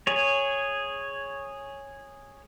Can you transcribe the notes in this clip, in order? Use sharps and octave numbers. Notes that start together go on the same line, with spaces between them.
G#4 C#5